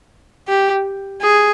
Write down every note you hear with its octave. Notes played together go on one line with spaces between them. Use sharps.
G4
G#4